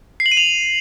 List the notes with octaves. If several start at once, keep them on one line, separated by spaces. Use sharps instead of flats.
C7
F#7
D#7
F7